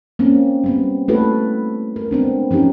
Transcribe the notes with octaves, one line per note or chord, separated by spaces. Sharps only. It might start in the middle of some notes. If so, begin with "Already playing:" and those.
A#3 C4 C#4
G3 B3 C4
A3 A#3 E4 F#4 A4 B4
A#4
G#3 B3 C4 D4
F3 C#4 D#4 G4